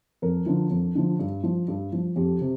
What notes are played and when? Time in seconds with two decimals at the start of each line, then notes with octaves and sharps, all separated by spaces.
0.22 F2 A#4
0.46 D3 F3
0.71 F2
0.95 D3 F3
1.19 G2
1.44 F3
1.68 G2
1.93 F3
2.16 F2 G4
2.41 C3